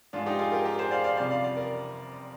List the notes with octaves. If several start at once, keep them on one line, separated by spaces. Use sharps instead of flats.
G#2 F3 G#3 D4 F4
D#4 G4
F4 G#4
G4 A#4
G4 A#4
G#4 C5
D5 F5
D5 F5
F2 C3 G3 D5 F5
D5 F5
D5 F5
A#4 D5